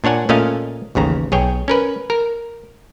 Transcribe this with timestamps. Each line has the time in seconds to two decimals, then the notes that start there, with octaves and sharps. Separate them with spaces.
0.04 A#2 D4 C#5 F#5 G#5
0.29 A#2 A3 C#4 D#5 F5
0.95 A1 D#2 C#3 A#5
1.32 B1 G#4 C#5 G5
1.68 C#4 A#4 B4
2.10 A#4